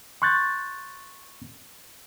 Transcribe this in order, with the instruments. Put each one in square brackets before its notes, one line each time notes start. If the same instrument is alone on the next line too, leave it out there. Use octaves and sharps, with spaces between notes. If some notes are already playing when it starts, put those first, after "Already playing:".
[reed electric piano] C6 C#6 F#6 G6 A6